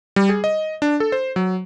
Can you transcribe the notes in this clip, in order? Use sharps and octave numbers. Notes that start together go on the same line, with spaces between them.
G3
G#4
D#5
D4
A4
C5
F#3